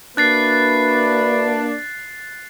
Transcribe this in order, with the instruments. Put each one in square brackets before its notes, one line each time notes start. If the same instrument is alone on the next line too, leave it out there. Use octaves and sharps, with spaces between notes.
[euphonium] A#3 [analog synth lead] D4 [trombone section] E4 F#4 B4 [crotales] F#6 A6 C7